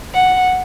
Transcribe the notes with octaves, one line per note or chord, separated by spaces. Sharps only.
F#5